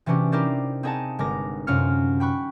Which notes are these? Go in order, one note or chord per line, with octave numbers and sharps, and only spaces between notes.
C3 E3 C#4 D4 F#4 G4
D#4 E4 G4 A#4 C5 D5
C4 D#4 G#4 D#5 F#5 A5
G1 G#3 A#4 D6 A#6
F#2 C3 C#4 F4 F6 C#7
G5 B5 C#6 F#6